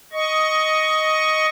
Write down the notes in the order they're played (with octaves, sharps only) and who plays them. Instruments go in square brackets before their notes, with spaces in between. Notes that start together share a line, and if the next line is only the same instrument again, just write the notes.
[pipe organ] D#5 C#6